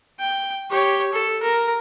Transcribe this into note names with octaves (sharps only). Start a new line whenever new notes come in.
G5
G4 C#5
A4
A#4